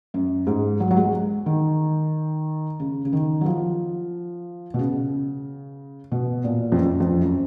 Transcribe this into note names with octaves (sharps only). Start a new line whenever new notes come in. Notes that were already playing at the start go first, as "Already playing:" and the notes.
F#2
G#2
F#3
F#3
G#3
D#3
C#3
C#3
D#3
F#3
F3
B2
C#3
B2
A#2
F2
F#2
F2
F#2